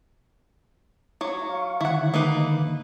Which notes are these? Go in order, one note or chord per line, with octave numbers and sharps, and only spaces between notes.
F#3 C#5
F5 C#6
D3 D#3 E4 F#5
A#3 D#4 B4